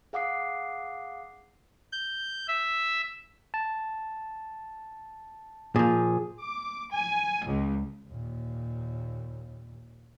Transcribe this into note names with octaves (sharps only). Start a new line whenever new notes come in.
G#4 F5 F#5 D6 D#6 C7
G6
E5
A5
A#2 F3 G#4
D6
G#5
C#2
D#2 A#2